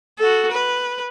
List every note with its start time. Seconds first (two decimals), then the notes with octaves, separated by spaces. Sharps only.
0.19 F#4 A4
0.52 B4